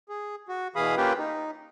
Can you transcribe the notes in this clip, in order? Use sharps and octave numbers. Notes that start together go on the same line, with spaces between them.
G#4
F#4
B2 E3 G#4 F5 B5 D#6
A#3 C#4 F4 G4 B4 G5
D#4